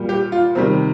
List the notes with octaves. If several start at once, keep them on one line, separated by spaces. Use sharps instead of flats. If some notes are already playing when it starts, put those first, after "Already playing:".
Already playing: A#2 G3
G4
F4
C3 D#3 G3 C4